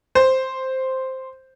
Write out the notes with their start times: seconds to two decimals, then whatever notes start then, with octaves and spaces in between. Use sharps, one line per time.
0.15 C5